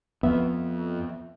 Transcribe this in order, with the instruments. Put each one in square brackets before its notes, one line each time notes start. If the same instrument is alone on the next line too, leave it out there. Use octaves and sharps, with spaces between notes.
[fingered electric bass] F2 [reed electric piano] B3 E5